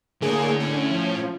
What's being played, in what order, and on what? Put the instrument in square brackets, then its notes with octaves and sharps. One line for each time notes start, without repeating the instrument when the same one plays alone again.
[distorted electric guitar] A2 C#5 [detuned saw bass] D3 [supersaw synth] A#3 G#4
[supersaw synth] C#4
[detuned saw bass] F3